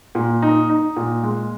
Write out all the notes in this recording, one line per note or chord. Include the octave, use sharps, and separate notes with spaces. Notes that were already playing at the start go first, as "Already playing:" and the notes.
A#2
D#4
D#4
A#2
G#3